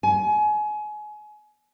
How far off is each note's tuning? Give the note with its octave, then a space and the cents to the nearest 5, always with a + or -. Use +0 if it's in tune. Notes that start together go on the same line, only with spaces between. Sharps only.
G#5 +30